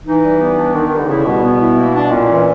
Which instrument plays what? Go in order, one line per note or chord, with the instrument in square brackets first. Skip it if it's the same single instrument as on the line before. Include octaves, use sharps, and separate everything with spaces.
[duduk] E3 [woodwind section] D#4
[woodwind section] G3
B3
D4
[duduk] D#3 [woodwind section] D#4
[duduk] D#3
[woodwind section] G3
[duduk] D3
[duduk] C#3 [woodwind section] E4
[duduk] B2 [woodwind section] G3
[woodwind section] B3
E4
A#3
D4
[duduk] A#2 [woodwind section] C#4
[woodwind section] E3